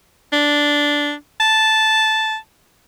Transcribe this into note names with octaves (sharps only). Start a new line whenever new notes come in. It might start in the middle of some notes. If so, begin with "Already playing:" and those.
D4
A5